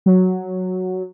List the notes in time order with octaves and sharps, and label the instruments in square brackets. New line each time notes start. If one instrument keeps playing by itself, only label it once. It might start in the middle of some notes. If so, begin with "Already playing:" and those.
[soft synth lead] F#3